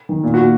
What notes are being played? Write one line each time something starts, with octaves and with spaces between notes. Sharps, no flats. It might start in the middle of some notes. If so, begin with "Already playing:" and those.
D#3
A#2
F#4
A#2